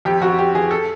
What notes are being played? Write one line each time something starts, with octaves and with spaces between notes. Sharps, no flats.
F2 G4
F2 F#4
F2 G4
E3 G#4
A4